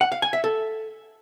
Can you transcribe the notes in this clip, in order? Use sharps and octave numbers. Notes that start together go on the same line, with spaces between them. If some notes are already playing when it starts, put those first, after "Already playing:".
F#5
F5
G#5
E5
A4